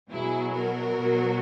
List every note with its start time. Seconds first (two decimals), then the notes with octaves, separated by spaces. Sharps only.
0.10 B2 F#3 E4 G#4
0.54 F#4 A#4
0.97 B2 F#3